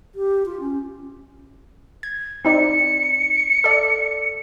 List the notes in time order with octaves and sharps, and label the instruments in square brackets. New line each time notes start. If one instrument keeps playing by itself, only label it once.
[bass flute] G4
F4
C#4
[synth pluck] G#6
[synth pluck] C4 D#4 D5 [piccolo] C#7
[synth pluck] A4 D5